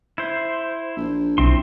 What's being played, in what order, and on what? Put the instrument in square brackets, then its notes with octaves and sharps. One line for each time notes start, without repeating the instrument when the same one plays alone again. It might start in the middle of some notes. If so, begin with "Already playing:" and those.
[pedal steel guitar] E4 C5
[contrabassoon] A#1
[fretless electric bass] B1 D4 [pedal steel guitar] C4 E4 C6